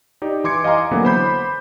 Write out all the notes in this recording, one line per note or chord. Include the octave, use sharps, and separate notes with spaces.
D#4 G4 D5
E3 C6 D6 G#6 C#7
D#5 F5 G#5 A#5 C6
D3 E3 F#3 A#3 B3
C5 B5 G6